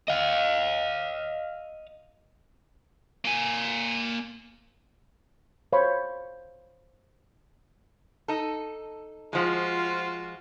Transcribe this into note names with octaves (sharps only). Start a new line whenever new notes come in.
D#5 F5
A#3 G#5
C5 C#5 F5 B5 C#6
D#4 A4
F3 G#3 F4 F#4 C5